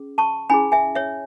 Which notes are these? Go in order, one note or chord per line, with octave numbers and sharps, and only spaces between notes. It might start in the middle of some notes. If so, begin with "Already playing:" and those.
Already playing: C#4 G#4
A5 C#6
C#4 E4 G#4 G#5 B5
E5 G#5
C#5 E5